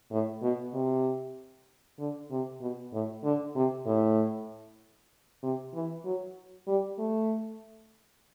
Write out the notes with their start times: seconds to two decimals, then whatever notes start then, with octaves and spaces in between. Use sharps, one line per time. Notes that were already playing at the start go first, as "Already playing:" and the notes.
0.11 A2
0.42 B2
0.74 C3
1.99 D3
2.31 C3
2.61 B2
2.92 A2
3.24 D3
3.55 C3
3.86 A2
5.43 C3
5.74 E3
6.05 F#3
6.67 G3
6.99 A3